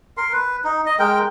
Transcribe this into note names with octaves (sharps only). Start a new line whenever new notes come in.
A#4 C6
B4
D#4
D#5
G#3 A#4 G5